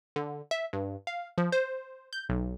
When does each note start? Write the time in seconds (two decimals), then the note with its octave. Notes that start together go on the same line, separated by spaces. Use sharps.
0.16 D3
0.51 E5
0.73 G2
1.07 F5
1.38 F3
1.52 C5
2.13 G6
2.29 B1